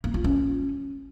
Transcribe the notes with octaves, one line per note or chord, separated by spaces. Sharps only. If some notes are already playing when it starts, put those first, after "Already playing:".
A#3
F4
C#4